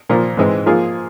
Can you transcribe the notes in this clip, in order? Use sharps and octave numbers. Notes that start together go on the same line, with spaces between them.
A#2 F3 A#3
G#2 E3 G#3 C4
F3 A#3 F4 G#4